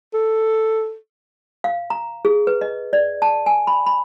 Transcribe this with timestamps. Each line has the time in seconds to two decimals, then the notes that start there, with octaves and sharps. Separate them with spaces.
0.14 A4
1.64 F5
1.90 A#5
2.25 G#4
2.47 B4
2.61 D#5
2.93 D5
3.22 A5
3.46 G#5
3.67 B5
3.86 B5